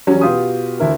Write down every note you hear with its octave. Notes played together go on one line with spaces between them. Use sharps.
E2 F#3 G3 C#4
B2 F4 G4 D#6
D2 E4 A#4